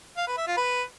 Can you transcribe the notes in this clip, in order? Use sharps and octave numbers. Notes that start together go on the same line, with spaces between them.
F5
B4
E5
F4
B4